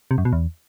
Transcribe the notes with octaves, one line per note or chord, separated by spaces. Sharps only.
C3
F#2
B2
E2